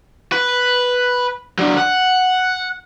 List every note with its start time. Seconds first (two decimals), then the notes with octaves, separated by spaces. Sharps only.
0.32 B4
1.58 F#3 D4
1.77 F#5